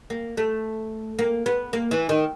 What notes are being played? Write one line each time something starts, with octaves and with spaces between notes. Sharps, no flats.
A#3
A3
A#3
B3
A#3
E3
D#3